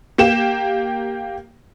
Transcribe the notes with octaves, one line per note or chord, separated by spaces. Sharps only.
A#3 G4 E7